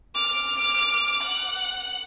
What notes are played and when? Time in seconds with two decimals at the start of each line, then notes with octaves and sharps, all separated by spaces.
0.14 D6 F6
1.23 F#5